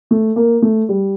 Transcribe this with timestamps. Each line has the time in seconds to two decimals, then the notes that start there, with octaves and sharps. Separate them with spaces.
0.11 A3
0.36 A#3
0.62 A3
0.89 G3